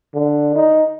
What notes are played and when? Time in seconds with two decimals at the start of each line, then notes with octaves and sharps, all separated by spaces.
0.14 D3
0.56 D#4